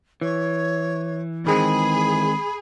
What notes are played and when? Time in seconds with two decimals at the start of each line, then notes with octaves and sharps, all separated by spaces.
0.21 E3 C#5
1.46 D#3 G#3 C4 G#4 B5